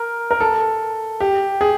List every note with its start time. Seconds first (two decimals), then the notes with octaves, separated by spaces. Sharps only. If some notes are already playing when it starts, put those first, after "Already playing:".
Already playing: A#4
0.31 A#4
0.40 A4
1.20 G4
1.61 G#4